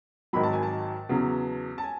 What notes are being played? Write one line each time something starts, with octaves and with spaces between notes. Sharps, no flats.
G#1 G#2 D#3 F#3 B5
A5
G#5
A5
E2 C#3 F#3 B3
A5
G#5